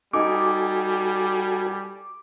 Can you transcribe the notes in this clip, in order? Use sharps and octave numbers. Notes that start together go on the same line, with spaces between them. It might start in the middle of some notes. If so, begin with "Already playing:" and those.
G3 D#4 F#4 A4 G#5 D6